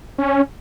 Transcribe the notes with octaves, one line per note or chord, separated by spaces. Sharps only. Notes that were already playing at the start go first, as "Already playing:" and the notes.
C#4